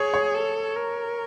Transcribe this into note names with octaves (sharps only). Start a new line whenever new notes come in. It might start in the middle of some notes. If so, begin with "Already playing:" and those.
Already playing: G#4 C#5
C#5
A4
A#4